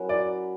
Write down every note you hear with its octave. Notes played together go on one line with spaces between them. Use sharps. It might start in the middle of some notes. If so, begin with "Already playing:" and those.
Already playing: F#3 C#4 E4 A#4 C#5
D5